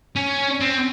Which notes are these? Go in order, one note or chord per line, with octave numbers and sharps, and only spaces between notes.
C#4
C4